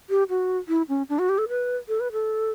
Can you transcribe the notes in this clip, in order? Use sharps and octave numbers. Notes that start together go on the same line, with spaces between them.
G4
F#4
E4
C#4
D4
F#4
G4
A4
B4
A4
B4
A4